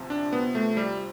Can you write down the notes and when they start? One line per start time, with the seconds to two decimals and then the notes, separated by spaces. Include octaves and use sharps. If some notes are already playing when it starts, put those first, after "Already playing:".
Already playing: D2 C3 F3
0.10 D4
0.33 B3
0.55 A3
0.77 G3